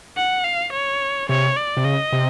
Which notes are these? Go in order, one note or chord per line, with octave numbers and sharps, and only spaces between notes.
F#5
F5
C#5
C3 C#5
D5
C3
C#3 D#5
C3